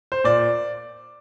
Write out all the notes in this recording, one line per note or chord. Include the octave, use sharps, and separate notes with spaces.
C5
A#2 D5